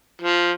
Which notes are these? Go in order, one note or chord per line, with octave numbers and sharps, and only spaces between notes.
F3